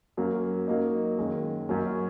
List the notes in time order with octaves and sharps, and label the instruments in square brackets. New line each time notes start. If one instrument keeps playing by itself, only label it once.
[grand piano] F#2 F#3 A#3
F#3 A#3 D#4
F#2 D#3 G#3
F#2 F#3 A#3 C#4 A#4